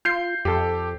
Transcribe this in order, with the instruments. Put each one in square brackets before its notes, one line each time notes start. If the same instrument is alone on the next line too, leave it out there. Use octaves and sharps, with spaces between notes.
[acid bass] F4 [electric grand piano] G6 C7
[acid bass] F2 [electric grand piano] G4 A4